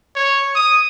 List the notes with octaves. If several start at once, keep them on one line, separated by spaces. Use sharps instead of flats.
C#5
D#6